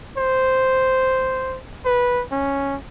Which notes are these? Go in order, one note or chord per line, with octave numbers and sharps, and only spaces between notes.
C5
B4
C#4